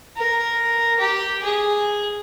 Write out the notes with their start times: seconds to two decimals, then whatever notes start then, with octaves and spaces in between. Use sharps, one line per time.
0.17 A#4
0.99 G4
1.44 G#4